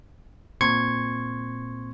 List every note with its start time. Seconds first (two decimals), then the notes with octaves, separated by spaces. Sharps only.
0.61 A#2 C4 C6 C#6 G#6 C#7